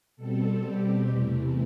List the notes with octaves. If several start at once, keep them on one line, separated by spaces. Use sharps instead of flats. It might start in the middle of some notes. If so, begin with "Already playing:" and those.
B2 G3 C4 A4
G4
E2 C3 E3 A3